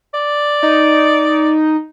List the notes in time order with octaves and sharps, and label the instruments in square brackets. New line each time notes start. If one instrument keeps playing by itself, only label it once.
[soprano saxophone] D5
[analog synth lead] D#4